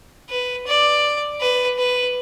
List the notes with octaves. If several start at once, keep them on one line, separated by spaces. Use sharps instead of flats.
B4
D5
B4
B4